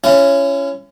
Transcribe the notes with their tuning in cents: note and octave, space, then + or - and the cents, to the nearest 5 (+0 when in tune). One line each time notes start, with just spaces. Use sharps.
C#4 +0 E4 +40